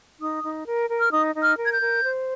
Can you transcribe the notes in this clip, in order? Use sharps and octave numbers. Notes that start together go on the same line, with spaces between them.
D#4 D#6
D#4
A#4
A#4
F6
D#4 D#6
D#4
F6
A#4
G#6
G6
A#4
C5